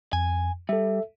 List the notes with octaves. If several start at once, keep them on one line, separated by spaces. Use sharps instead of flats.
F2 G#5
G3 A4 E5